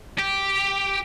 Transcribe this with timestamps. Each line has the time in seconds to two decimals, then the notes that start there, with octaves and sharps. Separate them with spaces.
0.19 G4